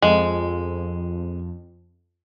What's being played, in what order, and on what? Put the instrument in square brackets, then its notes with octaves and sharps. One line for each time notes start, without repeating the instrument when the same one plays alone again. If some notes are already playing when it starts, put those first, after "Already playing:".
[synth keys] F2 [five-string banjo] G#3